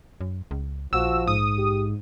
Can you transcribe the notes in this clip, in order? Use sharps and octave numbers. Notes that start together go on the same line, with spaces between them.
F#2
C#2
A#1 F3 F#4 E6
G#2 D#6
G4